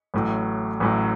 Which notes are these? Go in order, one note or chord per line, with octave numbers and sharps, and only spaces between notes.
A1 A2 F#3
A1 A2 F#3